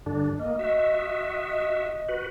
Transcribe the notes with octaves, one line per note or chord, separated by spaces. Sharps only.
G2 D3 D4
A#3 D#5
F#4 D#5 E5
F#4 B4